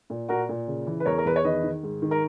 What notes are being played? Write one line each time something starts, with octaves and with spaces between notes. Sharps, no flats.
A#2
A#2 F#4 A#4
A#2
C#3
E3
B4
E2 A#4 C#5
A#4
E2 B4
C#5
D#3 B4 D#5
D#3
G#2
D#3
A#4